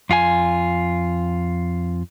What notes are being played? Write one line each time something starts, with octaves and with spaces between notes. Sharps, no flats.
F2 F4 F#4 G#5